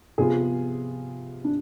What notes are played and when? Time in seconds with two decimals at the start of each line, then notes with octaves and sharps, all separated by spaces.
0.18 C3 F3 B3 F4 G#4
1.44 D4